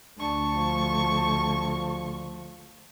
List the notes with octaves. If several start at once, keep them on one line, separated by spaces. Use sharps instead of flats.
D2 D4 A5 C#6
F3